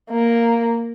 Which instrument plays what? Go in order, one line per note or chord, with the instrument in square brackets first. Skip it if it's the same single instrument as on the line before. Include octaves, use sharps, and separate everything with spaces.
[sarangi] A#3